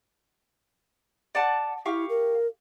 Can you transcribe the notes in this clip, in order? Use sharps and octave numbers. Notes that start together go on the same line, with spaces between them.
D5 F#5 A5
E4 G4 F5 C#6
A#4